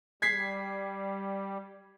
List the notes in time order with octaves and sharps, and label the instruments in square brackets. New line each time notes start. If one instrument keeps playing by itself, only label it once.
[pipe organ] G3 [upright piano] G#6 B6 C7